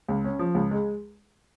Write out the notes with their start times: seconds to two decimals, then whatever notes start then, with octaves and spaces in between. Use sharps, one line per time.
0.08 C#2
0.24 C#4
0.39 F3
0.55 C#2
0.71 G#3